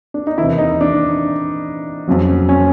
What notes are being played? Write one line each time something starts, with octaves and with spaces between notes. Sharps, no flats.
D4
D#4
E2 C3 D#3 E4
D#4
D4
F2 C#3 F#3
C#4